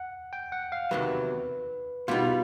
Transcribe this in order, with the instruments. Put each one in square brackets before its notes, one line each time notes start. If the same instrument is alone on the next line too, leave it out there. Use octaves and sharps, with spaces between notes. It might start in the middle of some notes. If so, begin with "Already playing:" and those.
Already playing: [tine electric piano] F#5
G5
F#5
F5
[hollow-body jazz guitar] E2 C3 D#3 F#3 [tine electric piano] B4
[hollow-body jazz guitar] B2 G3 B3 D#4 [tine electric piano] F4